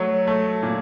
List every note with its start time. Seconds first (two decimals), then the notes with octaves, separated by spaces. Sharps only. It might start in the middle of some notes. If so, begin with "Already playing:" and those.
Already playing: F#3 A3
0.27 A3
0.63 A#2